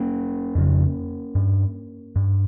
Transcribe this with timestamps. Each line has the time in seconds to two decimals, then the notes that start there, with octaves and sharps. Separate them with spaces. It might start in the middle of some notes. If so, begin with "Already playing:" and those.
Already playing: A#3 C#4
0.55 F2 C#3
1.35 G2
2.16 G2